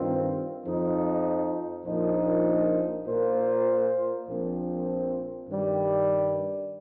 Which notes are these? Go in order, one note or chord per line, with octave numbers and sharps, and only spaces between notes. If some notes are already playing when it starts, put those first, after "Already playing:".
Already playing: G2 D#3 C4 F4
F2 F3 D#4
A#1 A#2 F3 D#4
A#2 A#3 F4 C5
A#1 A#2 F3 C4
G2 D#3 G3